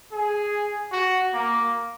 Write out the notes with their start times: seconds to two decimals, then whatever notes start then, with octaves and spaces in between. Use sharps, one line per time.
0.12 G#4
0.92 F#4
1.34 A#3